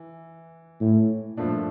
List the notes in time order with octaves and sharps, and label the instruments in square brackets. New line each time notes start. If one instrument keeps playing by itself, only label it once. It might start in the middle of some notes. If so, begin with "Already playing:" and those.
Already playing: [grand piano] E3
[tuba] A2
[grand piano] G2 F3 A3 D4 [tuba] A#2